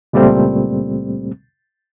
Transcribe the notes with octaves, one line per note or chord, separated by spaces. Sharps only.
C#2 A#2 G3 A3 C4